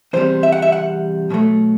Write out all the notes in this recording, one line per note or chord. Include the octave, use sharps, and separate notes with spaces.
E2 C3 G3 C5
E5
F#5
E5
F#5
B2 F#3 A3